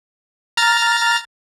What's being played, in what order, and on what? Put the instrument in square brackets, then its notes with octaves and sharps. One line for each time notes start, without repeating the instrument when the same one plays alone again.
[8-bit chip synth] A#5 F6 A6